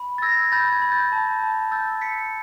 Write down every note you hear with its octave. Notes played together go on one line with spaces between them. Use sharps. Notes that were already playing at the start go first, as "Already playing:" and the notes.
Already playing: B5
A6
E6 G#6 A#6
B5 G6 A6
G#6
B5
G6 A6
A5
A5
E6 G6 A6
E6 B6 C#7